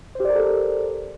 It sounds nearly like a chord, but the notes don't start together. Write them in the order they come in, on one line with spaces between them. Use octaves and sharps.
C5 G4 D5 A#4 A4